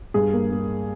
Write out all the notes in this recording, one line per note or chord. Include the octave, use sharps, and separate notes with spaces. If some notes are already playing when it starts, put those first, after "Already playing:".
G2 G#4
A#3
A#3